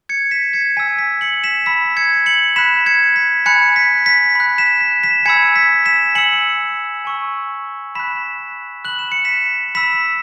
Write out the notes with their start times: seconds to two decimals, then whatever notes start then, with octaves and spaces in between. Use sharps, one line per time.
0.09 G#6 C#7
0.31 B6 E7
0.53 G#6 C#7
0.77 G#5 E6 B6
0.99 B6
1.21 C#7 F#7
1.44 B6 E7
1.66 B5 E6 B6
1.97 G#6 C#7
2.26 C#7 F#7
2.56 B5 F#6 B6 E7
2.86 G#6 C#7
3.16 B6
3.46 G#5 B5 F#6 G#6 C#7
3.76 B6
4.06 B6
4.35 B5 F#6 B6
4.58 B6 E7
4.81 B6
5.03 B6 E7
5.25 G#5 B5 E6 G#6 C#7
5.56 B6
5.86 B6 E7
6.15 G#5 E6 C#7 F#7
7.05 G#5 C#6 E6
7.95 B5 F#6 B6 E7
8.85 B5 F#6 F#7
8.99 E7
9.12 C#7
9.25 B6 E7
9.75 B5 E6 B6 E7